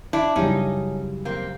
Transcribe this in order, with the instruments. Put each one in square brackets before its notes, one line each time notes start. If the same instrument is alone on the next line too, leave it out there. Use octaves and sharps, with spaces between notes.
[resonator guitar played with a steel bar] D4 E4
[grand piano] F#2 C#3 E3 G3 [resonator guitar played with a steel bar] C#4 D#4
[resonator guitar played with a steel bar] A#3 C4